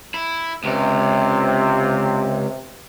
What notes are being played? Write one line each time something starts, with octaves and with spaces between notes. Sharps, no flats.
E4
C#2 C3